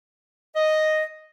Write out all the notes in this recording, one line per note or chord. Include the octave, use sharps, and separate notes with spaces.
D#5